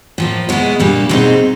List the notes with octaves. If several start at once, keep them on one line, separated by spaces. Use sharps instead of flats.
A2 F3 A#3
B2 G#3 B3 E4
A#2 G3 A#3 D4
B2 G#3 C4 D#4